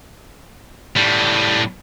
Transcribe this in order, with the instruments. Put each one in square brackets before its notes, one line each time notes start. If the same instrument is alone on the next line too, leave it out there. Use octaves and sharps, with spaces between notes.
[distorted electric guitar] A2 G3